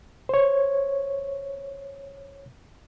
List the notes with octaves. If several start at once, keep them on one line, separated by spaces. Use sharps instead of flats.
C5 C#5